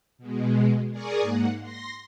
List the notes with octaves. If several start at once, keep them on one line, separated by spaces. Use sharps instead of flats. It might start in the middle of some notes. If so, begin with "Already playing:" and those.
B2 G#3
G#4 A#4 D5 G#5 C#6 D#6
G#2 A#3 F#5
C6 A#6